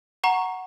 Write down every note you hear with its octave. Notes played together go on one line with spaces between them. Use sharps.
F#5 A#5 C#6